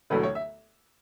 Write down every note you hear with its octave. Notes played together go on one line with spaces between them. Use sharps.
E1 D2 D3 F#3 A3 B4
C#5
E5